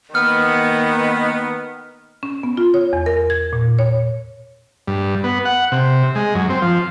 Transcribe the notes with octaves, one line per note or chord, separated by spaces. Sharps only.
D#3 A#3 B3 F6
C#4
B3
F4
C#5
E2
A#4
G#6
A#2
C#5
G2
B3
F#5
C3
G#3
F#2
C4
F3